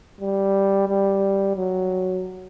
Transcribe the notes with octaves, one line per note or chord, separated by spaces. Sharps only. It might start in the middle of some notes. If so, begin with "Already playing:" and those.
G3
G3
F#3